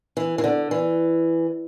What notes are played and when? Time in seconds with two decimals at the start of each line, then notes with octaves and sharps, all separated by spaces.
0.17 E3
0.38 E3
0.44 D3
0.71 E3